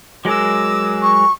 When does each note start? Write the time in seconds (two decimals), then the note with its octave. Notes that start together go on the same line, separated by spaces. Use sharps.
0.25 F#3 G#3 A#4 D6 E6
1.01 C#6